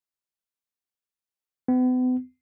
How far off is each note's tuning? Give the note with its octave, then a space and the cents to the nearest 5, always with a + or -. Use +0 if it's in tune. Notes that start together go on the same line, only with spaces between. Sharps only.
B3 +40